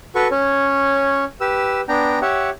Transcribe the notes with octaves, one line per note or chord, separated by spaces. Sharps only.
F#4 A4 B4 C#6
C#4 C#5
G4 B4 E6
B3 D4 G5 A#5
G4 C#5 E5 F#5